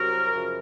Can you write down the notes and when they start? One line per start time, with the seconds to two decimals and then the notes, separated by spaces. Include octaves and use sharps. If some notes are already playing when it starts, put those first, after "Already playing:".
Already playing: C2 C3 F#3 F#4 A#4
0.34 F#2 C#3 F3